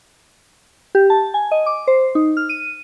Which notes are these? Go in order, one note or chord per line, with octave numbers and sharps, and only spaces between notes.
G4
A5
G#5
D#5
D6
C5
D#4
F6
D#7